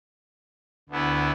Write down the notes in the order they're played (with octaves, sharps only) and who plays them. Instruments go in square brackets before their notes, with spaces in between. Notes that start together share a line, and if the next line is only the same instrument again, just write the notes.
[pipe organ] D2 D3 B3 E4